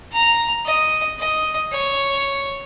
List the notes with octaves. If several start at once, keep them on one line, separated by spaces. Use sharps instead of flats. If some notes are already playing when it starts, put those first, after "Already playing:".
A#5
D#5
D#5
C#5